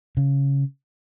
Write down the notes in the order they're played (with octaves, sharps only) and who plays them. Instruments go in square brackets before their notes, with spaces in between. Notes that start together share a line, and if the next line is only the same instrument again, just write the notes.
[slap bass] C#3